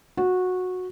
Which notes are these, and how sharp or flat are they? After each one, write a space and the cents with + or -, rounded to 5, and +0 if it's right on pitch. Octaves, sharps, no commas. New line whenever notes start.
F#4 -15